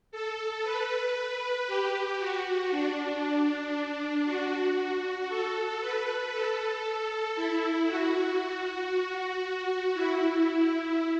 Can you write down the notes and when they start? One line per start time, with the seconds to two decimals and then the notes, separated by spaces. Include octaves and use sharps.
0.11 A4
0.63 B4
1.67 G4
2.19 F#4
2.71 D4
4.25 F#4
5.29 A4
5.81 B4
6.32 A4
7.36 E4
7.87 F#4
9.94 E4